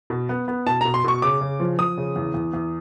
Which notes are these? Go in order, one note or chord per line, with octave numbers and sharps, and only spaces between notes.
B2
B3
B3
B2 A5
B2 A#5
C6
B2 C#6
C#3 D6
C#3
F3
F3 D#6
C#3
E2
E2
E2